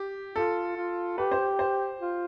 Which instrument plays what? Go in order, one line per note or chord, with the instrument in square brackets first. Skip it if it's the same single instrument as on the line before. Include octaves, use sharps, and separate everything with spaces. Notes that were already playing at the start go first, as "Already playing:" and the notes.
Already playing: [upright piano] G4
[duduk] F4 [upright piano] A4
[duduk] F4
[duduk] G4 [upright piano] B4
[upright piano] C5
C5
[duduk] F4